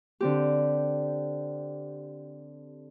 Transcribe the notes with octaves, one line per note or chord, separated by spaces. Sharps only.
D3 C4 G4